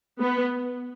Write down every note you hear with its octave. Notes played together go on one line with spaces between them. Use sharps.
B3